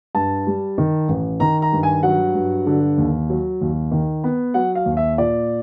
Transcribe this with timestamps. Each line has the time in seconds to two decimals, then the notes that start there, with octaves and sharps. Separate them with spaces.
0.15 G2 A5
0.47 G3
0.78 D#3
1.09 A1
1.40 D#3 A#5
1.62 A#5
1.72 G2
1.83 G#5
2.03 F#3 F#5
2.34 G2
2.66 D3
2.98 D#2
3.30 F#3
3.61 D#2
3.91 D#3
4.24 B3
4.54 F#3 F#5
4.75 F5
4.86 D#2
4.97 E5
5.18 A#2 D5